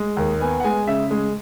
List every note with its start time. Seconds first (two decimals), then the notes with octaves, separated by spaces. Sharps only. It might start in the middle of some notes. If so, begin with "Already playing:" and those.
Already playing: G#3
0.17 D#2
0.40 B3 G#5
0.60 F#5
0.64 G#3 G#5
0.87 C#3 E5
1.11 G#3